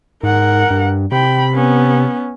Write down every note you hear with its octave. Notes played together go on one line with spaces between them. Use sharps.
G#2 A#4 F#5
G2
C3 G5 B5
B3 C#4